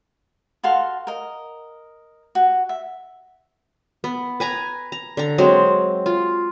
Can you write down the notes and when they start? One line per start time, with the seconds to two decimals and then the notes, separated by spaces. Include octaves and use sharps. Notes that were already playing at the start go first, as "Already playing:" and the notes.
0.63 F#4 A4 F5 C6
1.07 A#4 D#5
2.35 F#4
2.69 E5
4.04 B3
4.40 B4 G#5 A#5
4.92 A#5
5.17 D3 A#5
5.38 F#3 G#3 C4
6.06 F4